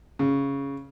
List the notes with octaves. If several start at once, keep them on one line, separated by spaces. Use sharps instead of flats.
C#3